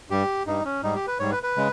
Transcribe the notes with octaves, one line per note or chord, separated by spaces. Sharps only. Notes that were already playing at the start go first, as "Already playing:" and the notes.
G2 G3 G4
G2 G3 D#4
C#4
G#2 G3 D#4
G4
B4
G#2 G3 C#5
B4
B4
C#3 G#3